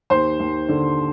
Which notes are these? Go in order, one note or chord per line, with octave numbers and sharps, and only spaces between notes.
D#2 C5
D#2
D3